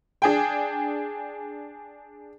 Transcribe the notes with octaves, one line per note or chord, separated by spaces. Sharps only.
D4 G#4 G5